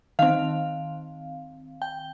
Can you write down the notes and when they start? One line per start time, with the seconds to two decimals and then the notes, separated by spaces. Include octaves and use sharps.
0.19 D#3 C4 F5
1.82 G5